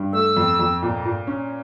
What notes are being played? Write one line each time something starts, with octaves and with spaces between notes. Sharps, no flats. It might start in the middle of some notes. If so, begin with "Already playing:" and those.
Already playing: G2
A3 E6
F2
F2
A#2
A#2
C#4